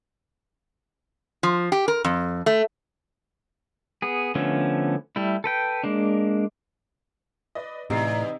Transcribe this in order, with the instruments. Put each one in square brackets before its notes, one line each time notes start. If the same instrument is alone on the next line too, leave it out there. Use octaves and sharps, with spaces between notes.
[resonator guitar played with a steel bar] F3
G4
A#4
F2
A3
[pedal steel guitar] B3 G#4
D3 F3 A3 B3 C#4
G3 A3 E4
A4 B4 G5
G#3 A#3 D4
[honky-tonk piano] B4 D5 D#5
[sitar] E2 [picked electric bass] A2 [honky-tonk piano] C3 C7 [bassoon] D#4